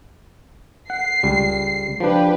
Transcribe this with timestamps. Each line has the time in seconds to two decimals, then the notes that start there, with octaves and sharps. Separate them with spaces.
0.90 F#5 C7
1.23 C#2 G3
2.00 F3 D4 G4 B4